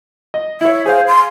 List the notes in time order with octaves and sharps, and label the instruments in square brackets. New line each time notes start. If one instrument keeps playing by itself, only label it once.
[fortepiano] D#5
[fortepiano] E4 C#5 [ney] E5
[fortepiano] G#4 F5 [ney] C5
[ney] C6